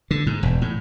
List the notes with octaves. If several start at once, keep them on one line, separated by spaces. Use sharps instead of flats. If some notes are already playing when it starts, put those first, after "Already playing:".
D3
G#2
E1
A2